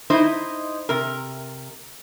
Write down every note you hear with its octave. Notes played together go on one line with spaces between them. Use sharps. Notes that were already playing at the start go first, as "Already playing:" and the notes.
D#4 E4 C5 D#5
C3 A#4